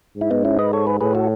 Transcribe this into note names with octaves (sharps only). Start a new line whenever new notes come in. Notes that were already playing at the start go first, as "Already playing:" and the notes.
G#2 E4
B3 D#4
C#4 E4
B4 D#5
A4 C#5
G#4 B4
A2 G#4 B4
F#4 A4